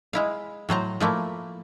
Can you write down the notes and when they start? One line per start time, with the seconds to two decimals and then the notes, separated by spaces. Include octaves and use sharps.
0.13 G#3 E4 F5
0.69 A2 F#3 C5 A#5
1.00 F3 A3 A#3 E4